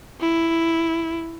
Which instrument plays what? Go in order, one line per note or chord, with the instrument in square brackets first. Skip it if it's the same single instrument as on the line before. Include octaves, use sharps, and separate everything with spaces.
[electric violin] E4